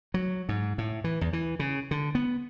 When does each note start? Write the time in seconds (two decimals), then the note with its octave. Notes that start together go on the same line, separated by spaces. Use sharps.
0.14 F#3
0.49 G#2
0.78 A2
1.04 E3
1.21 E2
1.33 E3
1.59 C#3
1.91 D3
2.15 B3